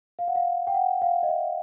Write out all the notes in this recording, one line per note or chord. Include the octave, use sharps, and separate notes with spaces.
F5
F#5
F5
G5
F#5
F5
D#5
E5